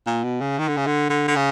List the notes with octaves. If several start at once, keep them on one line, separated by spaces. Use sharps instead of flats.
A#2
B2
C#3
D#3
D3
C#3
D3
D3
D3
C#3